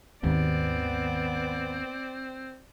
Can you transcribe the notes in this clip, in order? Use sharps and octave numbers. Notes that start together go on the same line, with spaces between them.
G#1 D#2 B3 C4 D5